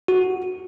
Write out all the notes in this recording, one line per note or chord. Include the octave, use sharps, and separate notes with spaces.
F#4